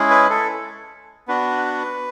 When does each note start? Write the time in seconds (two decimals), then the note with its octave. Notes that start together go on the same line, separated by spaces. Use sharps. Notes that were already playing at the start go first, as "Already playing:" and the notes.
Already playing: G#3 C#4 E4 G#4
0.11 B4
0.30 A4
1.28 B3 D4 F#4 B4